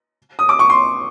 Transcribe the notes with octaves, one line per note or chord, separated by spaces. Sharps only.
D#6
D6
C#6
C6